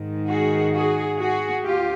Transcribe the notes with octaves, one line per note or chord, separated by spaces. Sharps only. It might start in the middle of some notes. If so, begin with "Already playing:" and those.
Already playing: G#2 D#3
F#4 G#4
F#4 G#4
F#4 G#4
D2 F4 G4